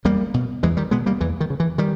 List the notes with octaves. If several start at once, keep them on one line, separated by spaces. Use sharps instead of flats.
E2 G3 A#3
B2
E2 E3 G#3
D#3 G3
B2 G#3 B3
G3 A#3
E2 E3
D#3
C#3
E3
D#3 G3